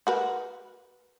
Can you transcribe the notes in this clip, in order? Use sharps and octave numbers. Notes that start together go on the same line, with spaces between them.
F#4 A#4 B4